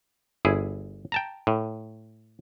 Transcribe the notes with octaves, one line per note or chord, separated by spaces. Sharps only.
G1 E4 G#4
G5 A5 A#5
A2